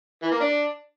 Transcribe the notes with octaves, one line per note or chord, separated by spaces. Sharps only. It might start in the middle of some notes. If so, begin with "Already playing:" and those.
E3
A#3
D4